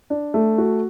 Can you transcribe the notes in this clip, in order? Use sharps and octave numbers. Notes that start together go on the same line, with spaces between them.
D4
A3
F#4